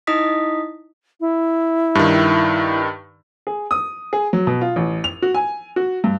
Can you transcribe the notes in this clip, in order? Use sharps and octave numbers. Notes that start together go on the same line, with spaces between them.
D#4 E4 D#5 D#6 B6
E4
G2 D#3
G#4
D#6
G#4
F#3
B2
F4
A1
F7
F#4
G#5
F#4
G2